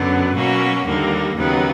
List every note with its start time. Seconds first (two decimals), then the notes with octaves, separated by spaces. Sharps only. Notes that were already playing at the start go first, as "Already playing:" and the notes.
Already playing: F#2 D3 F#3 B3
0.34 B2 F#3 A#3 C#4 F#4
0.85 D#2 D3 G3 A#3
1.36 D#2 C#3 F#3 B3 D#4